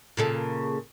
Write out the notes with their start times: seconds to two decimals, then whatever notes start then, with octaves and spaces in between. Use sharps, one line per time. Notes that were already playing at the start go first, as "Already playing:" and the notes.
0.17 A#2 C#3 A4